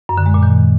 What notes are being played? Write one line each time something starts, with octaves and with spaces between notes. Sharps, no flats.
F#2
D3
G#3
A#2
D#3